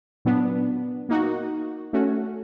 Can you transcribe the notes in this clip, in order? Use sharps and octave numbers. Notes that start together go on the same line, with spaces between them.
A#2 F#3 B3 D4
A#3 D#4 F#4
A3 C#4 F#4